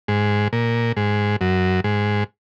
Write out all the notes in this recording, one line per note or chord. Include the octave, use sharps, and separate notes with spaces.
G#2
A#2
G#2
F#2
G#2